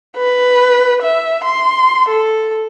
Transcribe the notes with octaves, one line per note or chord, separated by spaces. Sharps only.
B4
E5
C6
A4